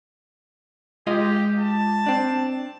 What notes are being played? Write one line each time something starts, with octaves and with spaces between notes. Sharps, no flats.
G#3 F4 G4 D#5
A5
C4 D4